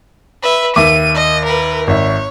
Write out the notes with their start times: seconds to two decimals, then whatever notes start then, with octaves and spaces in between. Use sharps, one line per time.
0.43 B4 E5
0.76 D#2 E5 D6 D#7
1.15 D#5
1.45 A#4 B4
1.87 G#1 C#5 E5